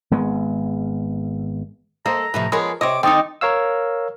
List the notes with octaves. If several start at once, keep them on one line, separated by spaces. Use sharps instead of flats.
G#1 G#3 B3
A#3 A4 C5 D#5 A#5
A2 C3 F3 B4
F3 G#3 B3 G#4 A#4 C#5
C3 C4 C#5 D#5 D6
D#3 C4 D#4 A4 G5 D6 D#6
A#4 C#5 F5 E6